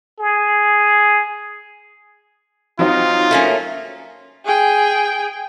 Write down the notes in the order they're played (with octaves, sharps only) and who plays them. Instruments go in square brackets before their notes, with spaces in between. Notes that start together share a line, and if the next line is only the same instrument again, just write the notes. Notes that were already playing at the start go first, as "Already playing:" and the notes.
[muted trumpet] G#4
[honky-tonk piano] F#3 C4 D#4 [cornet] F4
[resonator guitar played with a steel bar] A3 A#3 C#4
[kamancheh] G#4 G5